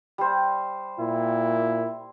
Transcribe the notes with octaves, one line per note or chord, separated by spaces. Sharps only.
G3 C5
A#2 E4